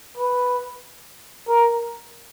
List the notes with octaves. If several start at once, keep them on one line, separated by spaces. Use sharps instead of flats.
B4
A#4